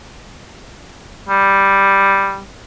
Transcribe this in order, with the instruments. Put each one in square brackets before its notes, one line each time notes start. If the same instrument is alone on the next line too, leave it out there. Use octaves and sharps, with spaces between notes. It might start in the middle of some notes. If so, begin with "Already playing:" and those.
[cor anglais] G3